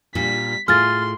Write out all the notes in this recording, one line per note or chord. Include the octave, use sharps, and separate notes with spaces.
A#2 G3 D4 B6
A2 F4 G#4 C6 F6 A6